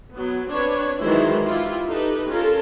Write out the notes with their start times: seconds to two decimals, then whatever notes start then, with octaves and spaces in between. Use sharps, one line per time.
0.13 F#3 B3
0.50 C4 D4 B4 C#5
1.00 D#3 E3 F#3 G#3 E4 C5
1.45 E4 F4 G4
1.88 D#4 G4 A4 B4
2.29 C#4 F4 A4 A#4